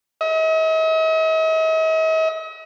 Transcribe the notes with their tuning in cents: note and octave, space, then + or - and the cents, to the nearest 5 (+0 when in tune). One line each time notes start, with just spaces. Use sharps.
D#5 +45